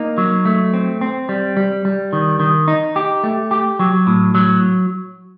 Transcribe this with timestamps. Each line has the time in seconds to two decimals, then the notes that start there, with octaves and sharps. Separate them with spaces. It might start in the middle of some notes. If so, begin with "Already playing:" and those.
Already playing: A#3 D#4
0.18 F#3
0.45 A3
0.74 C4
1.01 C4
1.29 G3
1.57 G3
1.85 G3
2.13 D#3
2.40 D#3
2.68 D#4
2.96 G4
3.23 A3
3.51 G4
3.79 F#3
4.07 A2
4.35 F#3